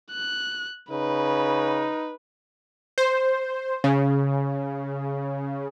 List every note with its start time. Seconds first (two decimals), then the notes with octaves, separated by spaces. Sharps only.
0.12 F#6
0.90 C#3 D#4 B4
2.98 C5
3.84 C#3